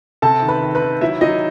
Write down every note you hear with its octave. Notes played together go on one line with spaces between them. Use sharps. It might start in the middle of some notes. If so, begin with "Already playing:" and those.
C3 A4 A5
D#3
B4 B5
D#3
B4 B5
D#3
F#3 E4 E5
F#3 D#4 D#5